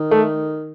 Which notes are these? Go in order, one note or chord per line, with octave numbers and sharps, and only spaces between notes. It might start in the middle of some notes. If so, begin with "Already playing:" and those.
Already playing: D#3
A3